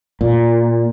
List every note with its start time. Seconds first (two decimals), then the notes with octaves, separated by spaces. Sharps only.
0.21 A#2